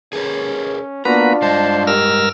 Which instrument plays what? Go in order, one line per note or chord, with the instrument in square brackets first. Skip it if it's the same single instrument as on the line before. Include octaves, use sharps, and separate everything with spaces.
[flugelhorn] C#4 [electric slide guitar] G#4 A#4 B4
[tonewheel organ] A#3 B3 B4 [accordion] D4 F4 [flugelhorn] F#4 [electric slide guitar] A#5
[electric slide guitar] G2 G#3 D#5 [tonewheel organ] C5 [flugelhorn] A5
[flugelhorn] G4 [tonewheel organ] A#4 E6 F6